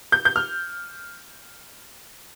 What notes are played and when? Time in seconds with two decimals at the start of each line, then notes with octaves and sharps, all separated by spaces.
0.12 G6
0.25 G6
0.36 F6